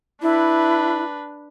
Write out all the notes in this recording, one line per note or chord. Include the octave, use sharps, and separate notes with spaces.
D4 E4 B4